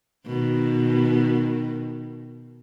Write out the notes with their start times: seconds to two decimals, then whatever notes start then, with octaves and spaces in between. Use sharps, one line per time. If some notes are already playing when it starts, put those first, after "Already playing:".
0.26 B2 D#3